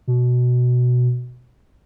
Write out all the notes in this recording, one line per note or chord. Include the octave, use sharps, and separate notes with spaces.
B2